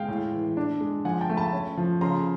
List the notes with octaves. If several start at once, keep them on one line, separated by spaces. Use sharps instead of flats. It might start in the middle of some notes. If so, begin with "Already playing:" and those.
Already playing: G#3 F5 G5
A2
E3
D4
G#3
F3 F#5 G#5
G5 A5
A3
A5 B5
C#4
F3
C#3 A#5 C6